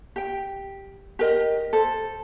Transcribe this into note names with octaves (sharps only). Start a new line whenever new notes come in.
G4 G5
G4 A#4 D#5
A4 C5